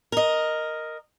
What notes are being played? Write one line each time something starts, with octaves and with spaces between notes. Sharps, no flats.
A#4 D#5